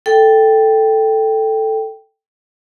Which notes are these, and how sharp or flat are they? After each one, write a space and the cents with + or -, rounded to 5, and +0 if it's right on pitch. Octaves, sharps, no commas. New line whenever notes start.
A4 +0 G5 +0